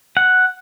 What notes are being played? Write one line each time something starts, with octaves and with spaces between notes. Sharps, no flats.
F#5